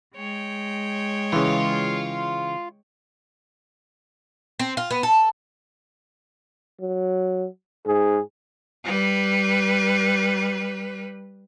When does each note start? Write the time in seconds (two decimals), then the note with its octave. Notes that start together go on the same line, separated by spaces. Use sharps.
0.15 G#3 C#5 G5
1.33 C#3 E3 F4
4.60 C4
4.77 F4
4.91 B3
5.03 A4
6.81 F#3
7.86 G#2 G#4
8.84 G3 B4